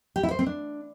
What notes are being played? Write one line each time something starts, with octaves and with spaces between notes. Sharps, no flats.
G4
E4
C5
C4
D4